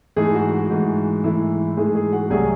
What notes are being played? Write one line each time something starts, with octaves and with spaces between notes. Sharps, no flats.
G#2 E3 G#3 A3 G#4
F#4
F#4
G#2 E3 A3
G#2 E3 A3 E4
G#2 E3 G#3 A3 G#4
G#3 G#4
F#4 F#5
C2 C3 F#3 A3 G#4 G#5